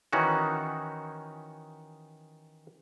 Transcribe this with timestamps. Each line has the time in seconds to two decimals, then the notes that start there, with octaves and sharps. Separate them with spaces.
0.13 D#3 E3 C#4 D#4 F#4